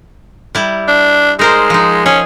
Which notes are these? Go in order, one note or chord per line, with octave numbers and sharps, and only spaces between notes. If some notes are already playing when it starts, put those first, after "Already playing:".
G3 E4
D4
G#3 D#4 A#4 C5
F3 D#4
C#4 G#4